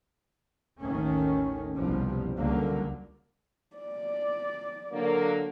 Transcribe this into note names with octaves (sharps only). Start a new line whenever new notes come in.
A1 D#2 D#3 A3 C#4
F#1 C2 B2 F3 G3
C#2 D3 F#3 G3 A#3
D5
D3 F#3 A#3